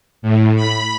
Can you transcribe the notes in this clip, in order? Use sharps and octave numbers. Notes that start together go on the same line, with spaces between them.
A2
B5